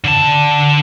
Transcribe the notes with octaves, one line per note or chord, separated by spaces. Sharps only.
D3 A5